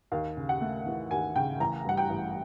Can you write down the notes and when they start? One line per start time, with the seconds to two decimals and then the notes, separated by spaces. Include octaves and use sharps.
0.12 D#2 F5
0.37 C#3
0.49 F#5
0.61 A3
0.86 E3
1.11 D#2 G#5
1.36 C#3 G5
1.60 A1 A#5
1.85 G2 F#5
1.97 G5
2.10 A1